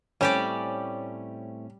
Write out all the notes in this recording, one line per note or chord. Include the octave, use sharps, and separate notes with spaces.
A2 G3 A3 C4 C#4 G4 D5